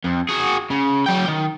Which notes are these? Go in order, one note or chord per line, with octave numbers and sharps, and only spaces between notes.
F2
F#4 G#4
C#3
F#3 G5
D#3